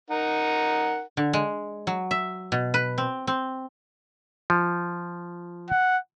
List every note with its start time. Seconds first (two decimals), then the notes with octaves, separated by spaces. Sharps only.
0.10 D#4 A#4 F#5
1.17 D3
1.33 G#3
1.87 F#3
2.11 E5
2.52 B2
2.74 B4
2.98 C4
3.27 C4
4.50 F3
5.70 F#5